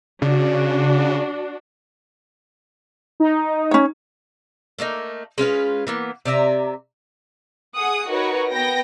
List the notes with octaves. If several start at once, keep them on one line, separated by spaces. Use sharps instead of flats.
C#3 D4 F#4
D#4
C#4 C#5
A3 A#3 C#4 D#4
G#3 C#4 F4 B4
E3 A#3 B3
C3 D5 E5 A#5
G#4 F#5 D#6
D#4 F#4 A#4 B4 C#5
B3 G5 A#6